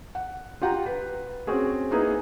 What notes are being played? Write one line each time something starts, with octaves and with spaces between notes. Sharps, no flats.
F#5
F4 G4 F#5 G5 A#5
B4
C4 C#4 F#4 G#4
A#3 B3 D#4 E4 G#4 A#4